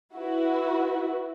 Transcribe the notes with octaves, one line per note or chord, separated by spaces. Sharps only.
E4 F#4 B4